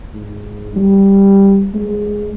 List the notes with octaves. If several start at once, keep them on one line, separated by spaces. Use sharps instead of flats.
G#2
G3
G#3